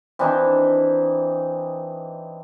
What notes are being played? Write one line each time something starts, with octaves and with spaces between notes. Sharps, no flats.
E3 C4 D4 D#4